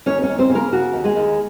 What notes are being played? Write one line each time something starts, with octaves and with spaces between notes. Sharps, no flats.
D#2 C#4 C#5
C#4 C#5
D#2
C4 C5
C#3
A#3 A#4
C#3 F#4
D#2
G#3 G#4
D#2